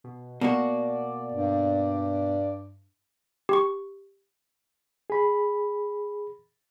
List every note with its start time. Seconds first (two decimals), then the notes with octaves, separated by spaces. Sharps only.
0.04 B2
0.41 B2 A#3 F#4 D5
1.32 G2
3.49 G4 C#6
5.10 G#4 B5